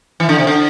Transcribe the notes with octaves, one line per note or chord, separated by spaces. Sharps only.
E3
D3
C3
D3